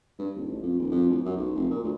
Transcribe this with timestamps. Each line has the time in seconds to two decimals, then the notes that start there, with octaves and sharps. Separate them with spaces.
0.19 G2
0.36 D#1
0.48 A1
0.63 F2
0.79 D#1
0.92 F2
1.10 D1
1.25 F#2
1.37 B1
1.55 F1
1.71 A#2
1.84 D2